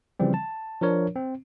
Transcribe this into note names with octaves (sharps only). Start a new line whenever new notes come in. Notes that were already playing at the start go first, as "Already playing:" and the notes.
C#3 E3 F3 G3 C4
A5
F3 D4 A#4 C#5
C4